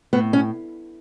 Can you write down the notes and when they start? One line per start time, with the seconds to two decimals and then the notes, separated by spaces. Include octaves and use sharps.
0.13 A2 B3
0.33 C#4